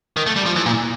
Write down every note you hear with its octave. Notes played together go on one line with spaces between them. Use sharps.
D#3
A3
G3
F3
E3
A#2